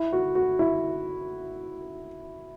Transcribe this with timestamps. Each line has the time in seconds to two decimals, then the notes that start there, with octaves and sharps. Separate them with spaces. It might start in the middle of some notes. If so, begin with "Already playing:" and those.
Already playing: E4
0.13 F#4
0.35 F#4
0.59 E4